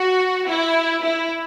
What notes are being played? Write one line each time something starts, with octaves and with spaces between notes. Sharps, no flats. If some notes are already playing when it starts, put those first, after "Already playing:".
Already playing: F#4
E4
E4